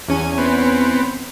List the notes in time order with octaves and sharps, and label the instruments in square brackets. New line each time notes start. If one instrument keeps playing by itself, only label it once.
[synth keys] E2 C#4 G#5
[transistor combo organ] B3 C4